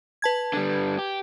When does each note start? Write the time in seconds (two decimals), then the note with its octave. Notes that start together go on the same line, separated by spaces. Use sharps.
0.22 B4 A5 G#6
0.54 D3 G3
0.98 G4